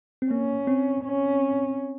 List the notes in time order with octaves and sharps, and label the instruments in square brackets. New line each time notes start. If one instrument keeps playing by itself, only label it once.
[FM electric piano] C4
[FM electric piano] A#3 [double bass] C#4
[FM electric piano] C4
[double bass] C#4